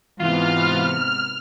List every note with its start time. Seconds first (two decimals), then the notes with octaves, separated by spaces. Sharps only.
0.19 G#2 C3 E3 B3 F4 F6